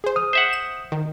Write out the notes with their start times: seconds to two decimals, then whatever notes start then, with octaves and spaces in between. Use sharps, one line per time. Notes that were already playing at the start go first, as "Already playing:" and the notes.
0.04 G#4 C5
0.16 D#6 F6
0.33 C5 E5 F#5
0.53 E7
0.92 D#3